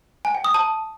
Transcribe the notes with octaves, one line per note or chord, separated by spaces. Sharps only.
G#5
G5
D#6
A5